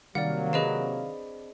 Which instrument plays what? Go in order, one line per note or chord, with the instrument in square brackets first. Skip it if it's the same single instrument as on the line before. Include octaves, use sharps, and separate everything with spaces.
[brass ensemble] C3 F#3 A#3 [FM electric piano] D#3 F5 [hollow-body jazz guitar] G3 [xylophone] D5 F#5
[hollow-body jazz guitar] C4 D4 B4 [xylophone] G#4 D#5 E7